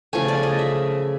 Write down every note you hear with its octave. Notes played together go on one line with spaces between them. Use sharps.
C#3 F3 A3 G#5
D5
D#5
E5